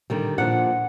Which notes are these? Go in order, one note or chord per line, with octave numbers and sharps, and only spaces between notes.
D3 D#3 G3
A#2 F3 D4 F#5